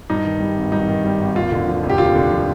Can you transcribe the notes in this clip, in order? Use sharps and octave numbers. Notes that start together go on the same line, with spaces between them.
G2 D#4
D#3
G3
G#1
G2 D#4
D#3
G3
G#1
D#2 F4
D3
F3
F1
G4
D#2 F4
D3
F3